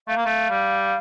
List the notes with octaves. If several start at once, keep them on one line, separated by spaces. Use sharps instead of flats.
A3 F5
A#3
A3
G3